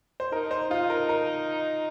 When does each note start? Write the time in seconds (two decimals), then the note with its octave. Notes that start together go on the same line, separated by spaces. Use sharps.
0.20 C5
0.32 D#4 A#4
0.51 C5
0.71 D#4 F4
0.90 A#4
1.09 A#4